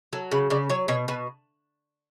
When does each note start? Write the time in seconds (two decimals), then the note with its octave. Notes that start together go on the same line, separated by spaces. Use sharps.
0.13 F#3 A4
0.32 C#3 B4
0.50 C#3 D5
0.69 F#3 C#5
0.88 B2 C#5
1.08 B2 B4